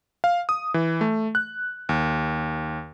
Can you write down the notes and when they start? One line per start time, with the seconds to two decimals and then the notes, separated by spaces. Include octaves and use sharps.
0.24 F5
0.49 D#6
0.74 E3
1.01 A3
1.35 F#6
1.89 D#2